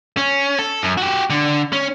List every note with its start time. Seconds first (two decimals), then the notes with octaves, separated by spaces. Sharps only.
0.17 C#4
0.59 A4
0.83 F#2
0.97 F#4 G4
1.30 D3
1.73 C#4